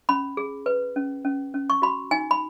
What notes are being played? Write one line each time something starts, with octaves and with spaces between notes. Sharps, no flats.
C#4 B5
G#4
B4
C#4
C#4
C#4
C#6
F#4 B5
D#4 G#5
B5